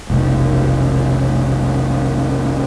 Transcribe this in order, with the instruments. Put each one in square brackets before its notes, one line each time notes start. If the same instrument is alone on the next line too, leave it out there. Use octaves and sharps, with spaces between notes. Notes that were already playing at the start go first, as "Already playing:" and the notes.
[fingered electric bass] F1 B1